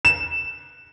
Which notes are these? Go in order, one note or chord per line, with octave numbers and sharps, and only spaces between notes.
E7